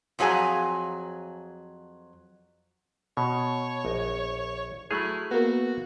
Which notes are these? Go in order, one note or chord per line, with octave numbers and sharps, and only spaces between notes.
F2 F3 F#3 G#4 G#5 A#5
B2 C#5
A#1 D#5
F#3 A3 E4 G#4 F6 F#6
A#3 B3 F#4